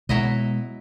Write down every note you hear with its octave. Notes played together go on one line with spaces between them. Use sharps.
B2 F#3 G#3 E4 D#5